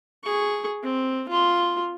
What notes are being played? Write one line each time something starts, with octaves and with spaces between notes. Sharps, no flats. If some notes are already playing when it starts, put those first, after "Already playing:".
G#4 C#6
C4
F4 C6